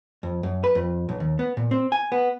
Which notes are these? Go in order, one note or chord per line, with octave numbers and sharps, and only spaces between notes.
F2
F#2
B4
F2
B1
D#2
B3
A#2
C4
G#5
B3